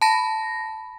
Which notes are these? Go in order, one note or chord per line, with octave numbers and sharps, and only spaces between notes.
A5 B5 A#6